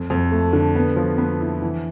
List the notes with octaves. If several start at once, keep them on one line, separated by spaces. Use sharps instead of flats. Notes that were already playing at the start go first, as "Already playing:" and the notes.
Already playing: F2
F2
A3
D3
B3
F3
B3
E4
E3